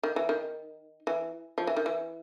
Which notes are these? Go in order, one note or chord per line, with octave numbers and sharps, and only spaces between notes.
D#3
E3
D#3
E3
F3
E3
D#3
E3